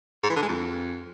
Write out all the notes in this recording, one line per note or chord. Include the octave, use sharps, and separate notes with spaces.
G#2
E3
D3
G#3
F2